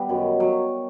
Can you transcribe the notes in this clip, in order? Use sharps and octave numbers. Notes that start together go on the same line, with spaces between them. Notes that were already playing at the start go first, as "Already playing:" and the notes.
Already playing: G3 B3
F#2 D#3 F#3
F#3